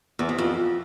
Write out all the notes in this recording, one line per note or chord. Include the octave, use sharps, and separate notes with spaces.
E2
C3
F2